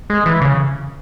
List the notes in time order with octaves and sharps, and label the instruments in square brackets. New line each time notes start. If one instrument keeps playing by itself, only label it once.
[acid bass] G#3
E3
C#3